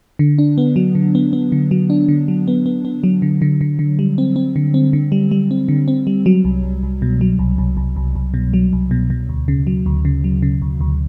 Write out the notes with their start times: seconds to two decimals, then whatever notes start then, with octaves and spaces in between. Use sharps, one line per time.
0.19 D3
0.39 D4
0.58 B3
0.76 F#3
0.95 D3
1.15 B3
1.33 B3
1.52 D3
1.71 F#3
1.90 D4
2.09 D3
2.28 F#3
2.48 B3
2.66 B3
2.85 B3
3.04 F#3
3.22 D3
3.42 D3
3.61 D3
3.79 D3
3.99 G3
4.18 C4
4.36 C4
4.56 D3
4.74 C4
4.93 D3
5.12 G3
5.31 G3
5.51 C4
5.68 D3
5.88 C4
6.07 G3
6.26 F#3
6.45 C2
6.63 C2
6.83 C2
7.02 B2
7.21 F#3
7.39 C2
7.58 C2
7.77 C2
7.96 C2
8.15 C2
8.34 B2
8.54 F#3
8.73 C2
8.91 B2
9.10 B2
9.29 D2
9.48 C#3
9.67 F#3
9.86 D2
10.05 C#3
10.24 F#3
10.42 C#3
10.62 D2
10.81 D2